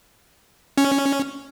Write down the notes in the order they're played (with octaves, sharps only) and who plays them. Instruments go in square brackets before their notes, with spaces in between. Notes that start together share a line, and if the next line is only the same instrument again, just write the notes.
[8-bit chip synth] C#4